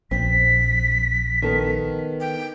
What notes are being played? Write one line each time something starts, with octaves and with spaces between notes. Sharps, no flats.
A#1 C4 B6
D#3 B3 A4
G5